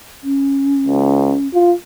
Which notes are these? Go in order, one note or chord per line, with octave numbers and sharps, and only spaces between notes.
C#4
C#2
F4